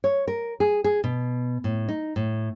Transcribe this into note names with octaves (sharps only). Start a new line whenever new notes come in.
C#5
A#4
G#4
G#4
B2
A2
D#4
A2